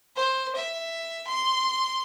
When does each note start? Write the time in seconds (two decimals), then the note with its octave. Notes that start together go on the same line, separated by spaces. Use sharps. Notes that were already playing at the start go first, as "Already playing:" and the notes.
0.16 C5
0.56 E5
1.28 C6